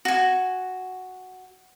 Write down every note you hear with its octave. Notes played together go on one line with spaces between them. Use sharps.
F#4 G#5